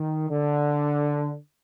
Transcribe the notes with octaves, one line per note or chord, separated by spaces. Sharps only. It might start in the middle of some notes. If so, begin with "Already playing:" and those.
Already playing: D#3
D3